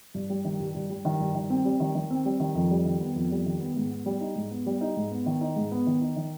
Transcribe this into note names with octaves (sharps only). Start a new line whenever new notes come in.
G2
G3
D#3
G2
G2
G3
D#3
G2
D#3
C4
G3
D#3
D#3
C4
G3
D#3
F2
G3
D#3
B3
F2
G3
D#3
B3
G#2
B3
G3
D#4
G#2
B3
G3
D#4
G#2
B3
D#3
D#4
G#2
B3
D#3
D#4
D#3